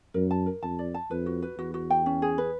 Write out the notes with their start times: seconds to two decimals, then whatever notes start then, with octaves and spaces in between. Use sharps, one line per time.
0.14 F#2 A#4
0.31 A5
0.46 A#4
0.63 F2 A5
0.79 D5
0.94 A5
1.10 F2 B4
1.26 F#4
1.42 B4
1.58 E2 F#4
1.74 F#4
1.90 G5
2.06 C#4
2.22 G#4
2.38 B4